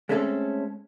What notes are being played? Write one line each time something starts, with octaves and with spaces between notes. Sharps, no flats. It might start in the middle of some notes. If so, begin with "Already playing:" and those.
G#3 A3 C4 C#4 G4 A4